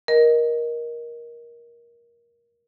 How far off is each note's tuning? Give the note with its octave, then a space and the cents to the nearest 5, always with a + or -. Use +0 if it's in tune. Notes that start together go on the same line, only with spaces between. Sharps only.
A#4 +15 D#5 +0